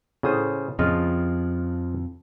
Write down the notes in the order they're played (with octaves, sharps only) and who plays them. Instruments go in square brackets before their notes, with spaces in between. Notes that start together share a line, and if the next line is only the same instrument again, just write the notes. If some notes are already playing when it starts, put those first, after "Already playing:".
[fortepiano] A2 A4 D#6 [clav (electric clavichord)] C#3 C5
[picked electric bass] F2 [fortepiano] C#3 [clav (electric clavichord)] F3 F4 D#5